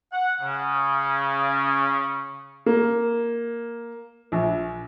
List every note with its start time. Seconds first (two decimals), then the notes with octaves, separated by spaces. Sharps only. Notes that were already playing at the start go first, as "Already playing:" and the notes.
0.12 F#5
0.41 C#3
2.66 A#3
4.32 A#1